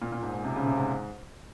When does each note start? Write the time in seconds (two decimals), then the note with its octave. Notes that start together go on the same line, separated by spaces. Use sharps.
0.02 A#2
0.12 A#2
0.23 G#2
0.34 G#2
0.45 C3
0.56 C#3
0.66 C3
0.77 G#2